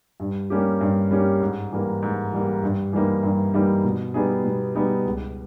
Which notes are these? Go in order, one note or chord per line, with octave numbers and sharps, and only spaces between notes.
G2
G3 A#3 C#4 G4
G2
G3 A#3 C#4 G4
G#2
E3 G3 A#3
G#2
E3 G3 A#3
G2
E3 G3 A#3 D#4
G2
E3 G3 A#3 D#4
B2
G3 B3 D#4 G#4
B2
G3 B3 D#4 G#4
C#2